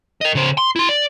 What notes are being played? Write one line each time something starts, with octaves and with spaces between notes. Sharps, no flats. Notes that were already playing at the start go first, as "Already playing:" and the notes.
A#4 D#5
C#3 C5
C6
E4 C6
D5